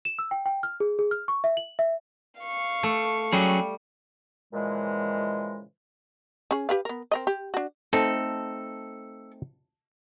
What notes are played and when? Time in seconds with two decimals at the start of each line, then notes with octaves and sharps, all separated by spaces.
0.05 E7
0.19 E6
0.31 G5
0.46 G5
0.63 F6
0.80 G#4
0.99 G#4
1.11 F6
1.28 C#6
1.44 E5
1.57 F#7
1.79 E5
2.41 F5 C#6
2.83 A3
3.32 F#3 G3 C#4 G#4
4.54 A#2 C#3 E3 F3 G#3
6.51 C#4 G#4
6.69 G4 B4 F5
6.85 B3 A#4
7.11 C4 A#4 D#5
7.27 G4
7.54 D4 F#4
7.93 A3 C4 D#4 A4